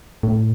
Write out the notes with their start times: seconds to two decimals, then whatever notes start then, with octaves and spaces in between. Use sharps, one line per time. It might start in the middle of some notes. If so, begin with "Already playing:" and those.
0.23 A2